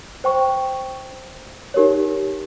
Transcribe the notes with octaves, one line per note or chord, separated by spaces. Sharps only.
C5 G5 C#6
D#4 G4 A#4 C#5